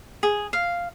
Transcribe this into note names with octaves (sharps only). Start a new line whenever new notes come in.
G#4
F5